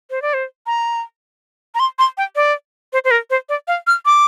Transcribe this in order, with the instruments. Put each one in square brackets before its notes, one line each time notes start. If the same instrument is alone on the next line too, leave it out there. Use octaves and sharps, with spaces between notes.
[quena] C5
D5
C5
A#5
A#5
C6
C6
G5
D5
C5
C5
A#4
C5
D5
F5
F6
D6